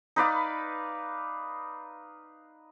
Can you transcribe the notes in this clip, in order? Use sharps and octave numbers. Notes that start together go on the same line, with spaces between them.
D#4 B4 D5 F5